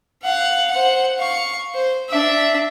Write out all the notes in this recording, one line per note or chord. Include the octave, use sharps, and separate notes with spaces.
F5 F#5
C5 F#5
F5 C#6
C5
D4 E5